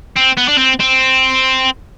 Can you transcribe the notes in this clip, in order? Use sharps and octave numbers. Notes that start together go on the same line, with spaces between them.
C4
B3
D4
C4
C4